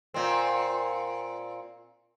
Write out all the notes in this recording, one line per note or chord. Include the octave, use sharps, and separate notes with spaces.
A#2 C4